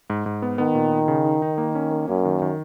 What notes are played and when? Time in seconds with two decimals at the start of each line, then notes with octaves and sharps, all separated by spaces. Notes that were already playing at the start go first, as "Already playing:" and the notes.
0.10 G#2
0.26 G#2
0.42 B3
0.58 D#3 B3
0.75 A#2
0.92 D#4
1.08 C#3
1.25 D#4
1.42 D#4
1.58 A#3
1.75 C#4
1.91 A#3
2.08 F#2 A#3
2.25 D#3
2.42 D#3